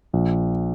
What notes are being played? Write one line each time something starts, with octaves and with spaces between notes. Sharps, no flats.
A#1